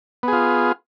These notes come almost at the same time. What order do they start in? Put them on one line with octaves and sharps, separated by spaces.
B3 G#4 F4